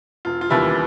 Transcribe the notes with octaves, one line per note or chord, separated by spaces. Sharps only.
E1 F4
F4
D#2 C#3 E3 G3 E4